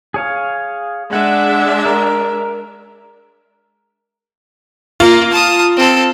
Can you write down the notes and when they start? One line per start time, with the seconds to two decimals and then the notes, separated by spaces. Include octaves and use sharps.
0.14 G#4 C#5 F5
1.13 G#3 D4 E5 F#5
1.85 A#4
5.00 A#3 F4
5.32 A5 D#6
5.77 C4 A4